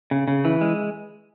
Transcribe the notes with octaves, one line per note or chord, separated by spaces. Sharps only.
C#3
C#3
E3
G#3